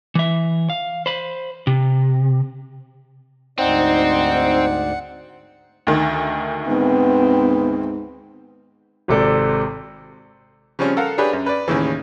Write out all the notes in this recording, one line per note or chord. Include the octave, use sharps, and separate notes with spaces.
E3 E5
F5
C5 B5
C3
D2 G#2 C4 D#4 D5 F#5
D2 D#3
G#2 B3 C4
G#1 C3 A4 D5
C#3 F3 G3 C4 C#4 C#6
A4 A#4 F5 F#5
D4 G4 G#4 B4 C#5
F#2
B4 D5
D#2 A2 C#3 E3